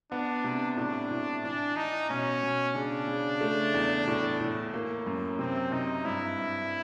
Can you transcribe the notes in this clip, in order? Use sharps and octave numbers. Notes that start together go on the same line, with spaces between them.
B3 D4
C3
A2 D4
A2
E3 D4
E3 D#4
B2 C#4
B2
C#3 D4
C#3
A3
E2
A2
A2
A#3
F#2
C3 C4
C3 D#4
G2 E4
G2